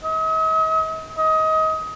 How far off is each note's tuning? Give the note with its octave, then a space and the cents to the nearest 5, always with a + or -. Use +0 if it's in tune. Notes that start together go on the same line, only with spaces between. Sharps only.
D#5 +45
D#5 +25